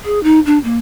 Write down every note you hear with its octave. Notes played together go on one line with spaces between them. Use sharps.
G#4
D#4
D4
A#3